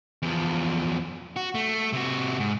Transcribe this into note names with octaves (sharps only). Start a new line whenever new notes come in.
E2 F3
F#4
A3
C3 F#4
G#2